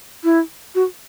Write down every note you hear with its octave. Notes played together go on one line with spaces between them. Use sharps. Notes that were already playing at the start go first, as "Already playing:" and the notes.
E4
F#4